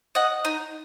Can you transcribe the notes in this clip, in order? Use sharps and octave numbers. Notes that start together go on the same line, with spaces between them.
D#5 F#5
D#4